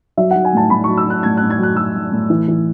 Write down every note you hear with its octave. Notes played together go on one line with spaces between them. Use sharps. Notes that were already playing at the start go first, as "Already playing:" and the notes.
F#3 E5
F#3 F#5
G#5
A2 A5
A2 B5
F#3 C#6
E6
F#3 F#6
A2 G#6
A2 F#6
G#6
F#3 F#6
F#3 E6
A2
A2
E3
E3